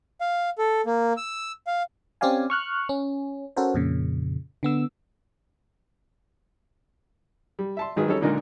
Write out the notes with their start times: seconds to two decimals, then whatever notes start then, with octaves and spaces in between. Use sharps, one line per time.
0.21 F5
0.58 A4
0.86 A#3
1.17 E6
1.67 F5
2.21 C4 C#4 G4 D5 F5 G#5
2.50 C#6 F6 F#6
2.89 C#4
3.57 C#4 F#4 A4 A#4 C5
3.74 F2 A#2 C#3
4.63 D3 B3 E6
7.59 G3
7.77 E5 A5 C6
7.96 G#1 D#3 F#3 G#4 B4
8.08 G3 C#4 D#4 A4 C#5
8.21 C#2 A#2 D3 D#4 A#4 D#5